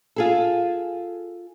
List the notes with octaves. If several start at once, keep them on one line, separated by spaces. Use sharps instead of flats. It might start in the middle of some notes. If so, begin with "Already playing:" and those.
F4 G#4 A4